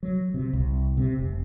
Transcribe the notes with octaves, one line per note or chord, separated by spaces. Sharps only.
F#3
C3
C2
C3
F1